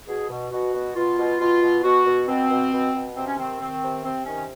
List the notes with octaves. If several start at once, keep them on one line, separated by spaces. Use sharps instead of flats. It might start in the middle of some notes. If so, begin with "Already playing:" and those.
B2 G#4
B2
B2 F#4
B2
B2 F4
B2
B2 F4
B2
B2 F#4
B2
B2 C4
B2
B2
B2
C3 C4
C#4
D#3 C4
D#3 C4
C3
C3 C4
D#3 C#4